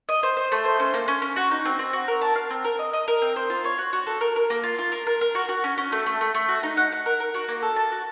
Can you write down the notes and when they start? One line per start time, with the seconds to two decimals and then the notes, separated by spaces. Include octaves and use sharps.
0.09 D#5
0.23 C5
0.37 C5
0.52 A3
0.65 C5
0.80 C#4
0.94 A#3
1.08 C#4
1.22 C#4
1.36 F#4
1.51 D#4
1.65 C4
1.79 C4
1.93 F#4
2.08 A#4
2.21 A5
2.36 F5
2.50 C4
2.64 A#4
2.79 D#5
2.93 D#5
3.08 A#4
3.22 C4
3.36 C5
3.50 F4
3.64 C#5
3.78 F#4
3.93 F#4
4.07 A4
4.21 A#4
4.36 A#4
4.50 A#3
4.63 F4
4.79 F4
4.92 A#4
5.07 A#4
5.21 A#4
5.35 F#4
5.49 F#4
5.64 C#4
5.78 C#4
5.92 A3
6.06 A3
6.21 A3
6.35 A3
6.49 F#4
6.63 D#4
6.77 F#5
6.92 F#5
7.06 A#4
7.20 A#4
7.34 F#4
7.48 A#3
7.62 A4
7.77 A5
7.92 F#4